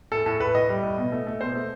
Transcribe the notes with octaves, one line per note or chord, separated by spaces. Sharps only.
A2 A4
A2 A4
A2 B4
A2 D#5
G3
A2
B2
A3
A3
B2 C5
A3